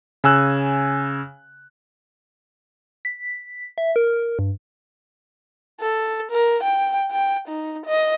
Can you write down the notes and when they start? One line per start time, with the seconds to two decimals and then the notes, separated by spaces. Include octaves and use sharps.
0.24 C#3 G#5 E6 F#6
3.05 B6
3.78 E5
3.96 A#4
4.39 G2
5.80 A4
6.31 A#4
6.64 G5
7.12 G5
7.48 D#4
7.86 D#5